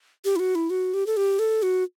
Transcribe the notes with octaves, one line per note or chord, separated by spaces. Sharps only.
G4
E4
F#4
E4
F#4
G4
A4
G4
A4
F#4